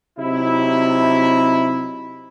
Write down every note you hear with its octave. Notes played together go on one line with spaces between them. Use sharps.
C3 F#3 D#4 E4